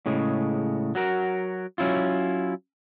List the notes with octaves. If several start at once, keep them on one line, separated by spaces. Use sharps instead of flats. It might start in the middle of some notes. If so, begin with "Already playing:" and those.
A2 C#3 G#3
F#3 F#4 A#4
F#3 C#4 E4 F4